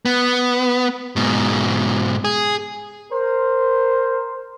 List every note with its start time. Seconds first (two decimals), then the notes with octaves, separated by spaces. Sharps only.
0.05 B3
1.16 G#2 B2
2.24 G#4
3.11 A#4 C5